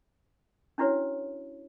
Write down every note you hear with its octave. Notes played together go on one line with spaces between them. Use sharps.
C#4 D4 E4 F#4 B4 C#5